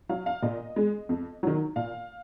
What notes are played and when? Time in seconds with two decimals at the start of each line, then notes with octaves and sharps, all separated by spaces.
0.09 F#3 F5
0.26 F5
0.42 A#2 D#5
0.76 G#3
1.09 F2
1.43 D#3 F#3
1.76 A#2 F5